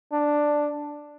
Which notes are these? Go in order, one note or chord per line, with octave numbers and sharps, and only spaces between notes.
D4